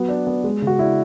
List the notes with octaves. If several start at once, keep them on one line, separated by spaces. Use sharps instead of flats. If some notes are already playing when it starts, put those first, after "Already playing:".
Already playing: F#3 B3
D4
B3
G#3
C#3
F#4
D4 E4